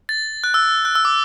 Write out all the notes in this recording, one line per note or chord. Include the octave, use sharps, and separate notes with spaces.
A6
F#6
E6
F#6
E6
D6